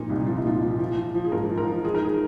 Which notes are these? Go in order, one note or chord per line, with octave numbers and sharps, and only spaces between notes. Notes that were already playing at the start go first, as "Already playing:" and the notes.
Already playing: A#2 F3 D#4
C2
F3 F4
D#4
A#2 F4
F3
F3
F3
F3
G#4
G#2 A#4
F3
A#4
F3
D#3 G#4
A#4
D#3 G#4